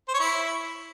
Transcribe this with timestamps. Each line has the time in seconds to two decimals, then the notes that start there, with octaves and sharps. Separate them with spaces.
0.08 C5
0.14 C#5
0.20 E4